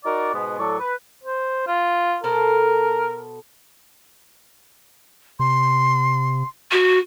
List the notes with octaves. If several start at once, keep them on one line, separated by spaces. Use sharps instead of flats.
D#4 F#4 A#4 D5
G#2 B2 G#3 B3
A2 F#3 A4 D5 C#6
B4
C5
F4
B2 A4 A#4 C5
C3 C6
F#4